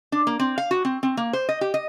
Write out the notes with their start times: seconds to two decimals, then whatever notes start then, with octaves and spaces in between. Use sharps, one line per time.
0.12 D4
0.27 A#3
0.39 C4
0.58 F5
0.71 F#4
0.85 C4
1.03 C4
1.17 A#3
1.33 C5
1.49 D#5
1.61 G4
1.74 D#5